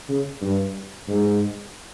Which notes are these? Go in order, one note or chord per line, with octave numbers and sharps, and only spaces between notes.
C#3
G2
G#2